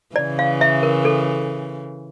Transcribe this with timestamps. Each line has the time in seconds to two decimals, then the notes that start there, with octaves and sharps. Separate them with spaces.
0.16 C#3 E3 D5
0.39 F5
0.61 E5
0.83 A#4
1.05 A4